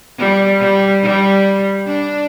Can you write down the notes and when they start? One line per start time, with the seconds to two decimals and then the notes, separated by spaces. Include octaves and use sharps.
0.18 G3
0.60 G3
1.03 G3
1.87 D4